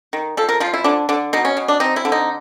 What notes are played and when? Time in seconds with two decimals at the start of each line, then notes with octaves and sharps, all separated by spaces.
0.13 D#3
0.37 F3 A4
0.49 A#4
0.60 F3 F4
0.74 E4
0.84 D3 D4
1.09 D3 D4
1.33 B2 D#4
1.45 C#4
1.57 B2
1.68 D4
1.80 C4 D#4
1.96 E4
2.05 D3
2.12 D#4